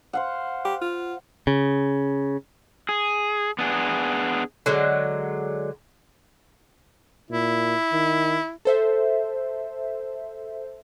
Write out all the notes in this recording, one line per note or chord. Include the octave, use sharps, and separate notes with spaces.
C5 F5 F#5
G4
F4
C#3
G#4
B3 D4 G#4
D3 F#3 G#3
A#2 E4
D#3
A4 C5 E5